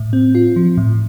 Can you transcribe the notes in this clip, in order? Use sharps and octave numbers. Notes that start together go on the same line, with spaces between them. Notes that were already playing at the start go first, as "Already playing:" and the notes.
Already playing: A2
C4
F4
F3
A2